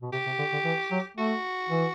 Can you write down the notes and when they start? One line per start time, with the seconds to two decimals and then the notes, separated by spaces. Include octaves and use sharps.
0.02 B2
0.12 C3 G4
0.27 C3
0.39 D3
0.53 D3
0.65 E3
0.91 F#3
1.17 A3 F#4
1.70 E3